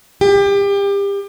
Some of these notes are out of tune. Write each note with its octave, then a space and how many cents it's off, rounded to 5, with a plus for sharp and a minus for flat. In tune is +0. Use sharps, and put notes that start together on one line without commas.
G4 +30